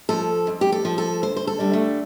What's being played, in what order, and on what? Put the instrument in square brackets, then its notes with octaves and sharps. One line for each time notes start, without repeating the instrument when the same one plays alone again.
[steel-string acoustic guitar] F3 A4
F2
G4
A4
F3
A4
D2 C5
C5
A4
D3 G3
A3